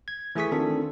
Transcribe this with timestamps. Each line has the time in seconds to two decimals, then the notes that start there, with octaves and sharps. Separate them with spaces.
0.08 G#6
0.35 E3 A3 G#4 G#5 C#6 B6
0.52 D#3 C4 D4 F4 A4